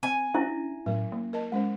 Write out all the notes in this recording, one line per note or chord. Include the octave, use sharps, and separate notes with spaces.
C4 G#5
C#4 D4 E4 E5
A2 F#3 A#4
A#3
A#4 D#5 A5
G#3 C#4 C5